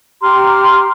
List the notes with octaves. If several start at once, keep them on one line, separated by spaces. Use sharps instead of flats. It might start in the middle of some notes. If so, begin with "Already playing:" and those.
G4 A#5 C6 F6